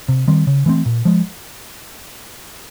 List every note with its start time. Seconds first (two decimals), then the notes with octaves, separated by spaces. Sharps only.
0.08 C3
0.28 D#3 G3 C4
0.47 C#3
0.66 E3 A3 C4
0.86 A#2
1.05 F3 G#3